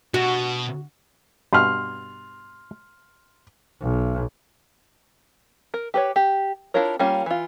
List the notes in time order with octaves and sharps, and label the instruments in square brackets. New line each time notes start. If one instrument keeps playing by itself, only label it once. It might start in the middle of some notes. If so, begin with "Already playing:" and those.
[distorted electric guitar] B2 [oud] F#4
[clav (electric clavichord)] G2 B2 B4 [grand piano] C6 F6
[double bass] B1
[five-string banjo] A#4
G4 B4 C#5
G4
D4 E4 F4 A#4 C#5
G3 A#3 C#4 F4
E3 F4